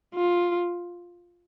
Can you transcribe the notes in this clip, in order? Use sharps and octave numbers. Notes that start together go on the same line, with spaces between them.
F4